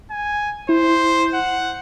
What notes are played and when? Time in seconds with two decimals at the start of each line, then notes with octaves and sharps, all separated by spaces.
0.11 G#5
0.69 E4 C5
1.34 F#5